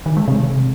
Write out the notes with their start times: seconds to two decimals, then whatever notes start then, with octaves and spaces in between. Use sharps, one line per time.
0.06 D#3
0.17 G#3
0.28 C3